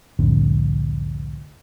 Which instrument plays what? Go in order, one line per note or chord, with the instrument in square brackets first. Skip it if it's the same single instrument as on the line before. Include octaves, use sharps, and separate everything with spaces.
[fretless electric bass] C2 F2 A2 D3